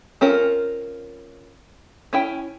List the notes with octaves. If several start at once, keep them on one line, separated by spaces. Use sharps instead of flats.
C4 C#4 F4 A#4
C#4 E4 G5